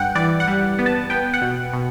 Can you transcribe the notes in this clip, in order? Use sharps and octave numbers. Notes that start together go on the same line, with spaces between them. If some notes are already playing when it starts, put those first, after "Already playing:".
Already playing: G2 F#5 G5
E3 D5
F#5
G3
B3
A5
B3 G5
F#5
B2
B2